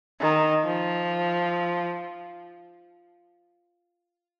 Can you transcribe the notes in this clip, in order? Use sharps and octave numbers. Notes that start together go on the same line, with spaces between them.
D#3
F3